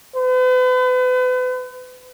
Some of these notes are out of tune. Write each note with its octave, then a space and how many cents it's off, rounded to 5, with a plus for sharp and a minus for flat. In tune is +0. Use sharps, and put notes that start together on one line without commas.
B4 +40